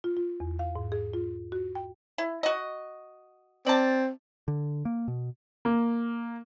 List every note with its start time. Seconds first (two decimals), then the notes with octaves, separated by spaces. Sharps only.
0.04 F4
0.17 F4
0.40 E2
0.59 F5
0.76 G#2
0.92 G#4
1.14 F4
1.52 F#4
1.75 G5
2.18 E4
2.43 F#4 D#5
3.66 C4 D5 A5
4.48 D3
4.85 A#3
5.08 B2
5.65 A#3